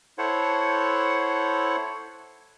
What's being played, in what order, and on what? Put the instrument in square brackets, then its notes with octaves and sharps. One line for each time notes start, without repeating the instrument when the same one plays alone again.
[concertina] E4 A4 C5 C#5 F#5